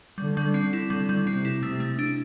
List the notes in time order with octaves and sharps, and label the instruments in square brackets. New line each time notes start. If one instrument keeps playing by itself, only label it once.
[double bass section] D3 [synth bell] G3
[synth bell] G3
C4
E4
[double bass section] D3 [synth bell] G3
[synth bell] G3
[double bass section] C3 [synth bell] C4
[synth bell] E4
[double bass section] C3 [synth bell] A3
[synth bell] A3
D4